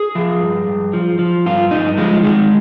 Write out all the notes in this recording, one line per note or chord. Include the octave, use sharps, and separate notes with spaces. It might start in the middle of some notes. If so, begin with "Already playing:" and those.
Already playing: G#4
F3
G2
G2
F3
F3
G2 F4
G2 D#4
F3 G#3
D#3 G#3